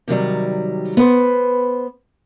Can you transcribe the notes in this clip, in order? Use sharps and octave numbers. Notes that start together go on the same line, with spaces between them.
C3 D#3 F#3 G3
B3 B4 C5